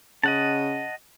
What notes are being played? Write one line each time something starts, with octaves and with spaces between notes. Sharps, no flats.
C#3 D#5 F#5 A5